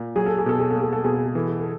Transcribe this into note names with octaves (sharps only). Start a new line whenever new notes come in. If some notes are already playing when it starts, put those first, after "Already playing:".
Already playing: A#2
F#3 G#4
A4
G#4
B2 A4
G#4
A4
A#3
G#4
A4
B2 G#4
A4
G#4
E3 A4
G#4
A4